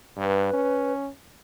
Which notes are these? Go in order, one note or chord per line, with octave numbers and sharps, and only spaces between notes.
G2 B4
C#4